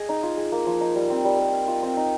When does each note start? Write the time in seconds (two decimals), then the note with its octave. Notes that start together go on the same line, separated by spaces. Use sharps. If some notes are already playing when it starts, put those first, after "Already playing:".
Already playing: G#4 D#5
0.09 D#4
0.23 F4
0.37 G#4
0.52 A#3
0.66 F3
0.81 D#4
0.95 G3
1.10 C4
1.25 G3
1.39 A#4
1.53 F5
1.68 F4
1.83 C4
1.97 D#4